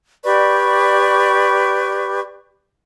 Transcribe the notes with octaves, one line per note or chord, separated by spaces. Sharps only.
G4 B4 D5 C#6